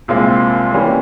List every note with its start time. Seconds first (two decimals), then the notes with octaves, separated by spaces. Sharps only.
0.08 C2 A#2 G#3 C4 F4
0.72 E3 G3 A#3 C#4 G4